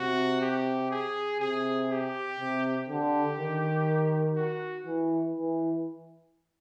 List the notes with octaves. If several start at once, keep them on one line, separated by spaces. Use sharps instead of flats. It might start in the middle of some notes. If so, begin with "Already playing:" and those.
Already playing: C3 F#4
G4
G#4
C3 G#4
G4
C3
D3 G4
D#3
F#4
E3
E3